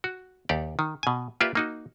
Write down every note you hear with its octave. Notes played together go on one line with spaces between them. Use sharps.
F#4
D#2 G4 D5
D#3
B2 G#5
A#3 F4 G4 B4 D5 E5
A#3 D#4 F#4